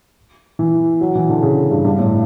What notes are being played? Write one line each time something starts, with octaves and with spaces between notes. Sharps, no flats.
E3
F#3
E3
D3
C#3
G2
G2
A2